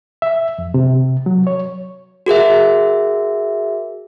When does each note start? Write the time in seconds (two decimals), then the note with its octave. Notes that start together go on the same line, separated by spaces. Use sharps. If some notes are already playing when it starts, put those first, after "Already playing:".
0.22 E5
0.59 F2
0.74 C3
1.26 F#3
1.47 C#5
2.26 F#4 G#4 A#4 E5